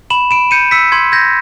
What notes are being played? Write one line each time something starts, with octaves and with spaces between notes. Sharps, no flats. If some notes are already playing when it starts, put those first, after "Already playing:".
B5 E7 F#7
B5 D7 E7
G6 C#7 D#7
E6 B6 C#7
C6 G#6
G6 G#6 A#6